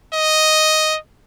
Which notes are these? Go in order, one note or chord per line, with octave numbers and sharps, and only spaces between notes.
D#5